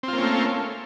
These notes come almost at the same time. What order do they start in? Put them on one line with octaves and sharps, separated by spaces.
C4 F4 A#3 C#4 A3